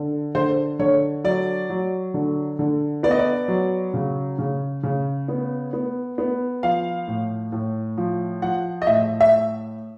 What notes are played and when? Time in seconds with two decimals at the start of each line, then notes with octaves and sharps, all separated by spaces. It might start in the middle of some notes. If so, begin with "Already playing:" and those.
Already playing: D3
0.35 D3 C5
0.79 D3 C#5
1.24 F#3 D5
1.70 F#3
2.14 D3
2.59 D3
3.03 B3 D5
3.11 D#5
3.19 D5
3.48 F#3
3.94 C#3
4.39 C#3
4.83 C#3
5.28 B3
5.73 B3
6.18 B3
6.63 F3 F5
7.08 A2
7.52 A2
7.97 F3
8.42 F3 F#5
8.82 D#5
8.87 A2 E5
9.21 E5